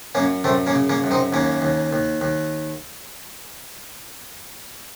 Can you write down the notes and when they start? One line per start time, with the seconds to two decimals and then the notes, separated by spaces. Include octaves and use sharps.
0.15 F#2 A#3 C#4
0.44 F#2 A3 C4
0.67 A#3 C#4
0.74 C#3
0.90 A#3 C#4
1.04 F#2
1.11 C4 D#4
1.33 D#2 A#3 C#4
1.62 D#2
1.93 D#2
2.21 D#2